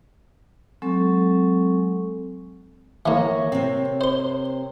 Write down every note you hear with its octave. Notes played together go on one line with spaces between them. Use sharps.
F#3 G#3 C4 A4 C#6
E3 A#3 A#4 C#5
C3 C4
C5 C6